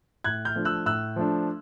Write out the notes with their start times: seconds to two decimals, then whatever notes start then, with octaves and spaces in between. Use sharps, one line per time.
0.24 A2 F#6 G#6
0.45 F6 G6
0.55 F3 A3 D4
0.65 E6 F#6
0.86 A2 E6 F#6
1.16 F3 A3 D4